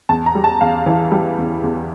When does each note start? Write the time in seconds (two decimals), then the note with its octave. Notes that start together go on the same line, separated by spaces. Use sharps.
0.09 E2 A5
0.26 A#5
0.35 G3
0.44 A5
0.61 E2 F5
0.86 E3
1.11 G3
1.38 E2
1.63 E2